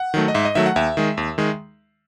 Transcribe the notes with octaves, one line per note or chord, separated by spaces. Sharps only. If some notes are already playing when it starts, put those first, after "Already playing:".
Already playing: F#5
D#3 F#3 A3
D#5
G#2 E5
D#5
D#3 F#3 A3 E5
F#5
D#2 E5
D#3 G#3
D#2
D#3 G#3